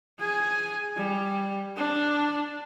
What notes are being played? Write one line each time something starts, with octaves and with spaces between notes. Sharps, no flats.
G#4 G#5
G3
D4